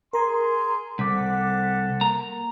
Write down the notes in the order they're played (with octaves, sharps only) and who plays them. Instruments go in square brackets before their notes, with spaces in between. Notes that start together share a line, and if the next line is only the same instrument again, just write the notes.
[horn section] G#4 C6 [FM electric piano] A#4 A#5
[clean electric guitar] C2 [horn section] C4 A4 F#5 [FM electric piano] D6 B6
[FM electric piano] A#3 [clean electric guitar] A#5